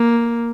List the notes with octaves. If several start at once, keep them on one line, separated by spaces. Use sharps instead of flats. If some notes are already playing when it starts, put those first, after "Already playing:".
Already playing: A#3